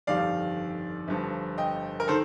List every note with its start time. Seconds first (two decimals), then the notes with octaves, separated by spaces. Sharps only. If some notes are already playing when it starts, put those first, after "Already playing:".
0.07 G1 F2 D#3 G3 D5 F5
1.08 G1 G2 F3
1.58 D#5 G5
2.00 A#4
2.08 D#3 A4 C5